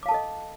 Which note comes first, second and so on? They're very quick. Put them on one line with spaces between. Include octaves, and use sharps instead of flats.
D6 F5 A5 A4 D#5